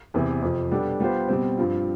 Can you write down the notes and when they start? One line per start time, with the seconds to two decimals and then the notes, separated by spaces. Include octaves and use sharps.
0.14 E2 C3 E3
0.42 F2 C3 F3
0.71 B2 G3 B3 D4 A4
1.00 G3 B3 F4 C5
1.29 B2 G3 C4
1.58 G2 F3 C4 F4